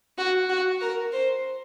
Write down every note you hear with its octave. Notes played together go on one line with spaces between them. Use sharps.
F#4
F#4
A#4
C5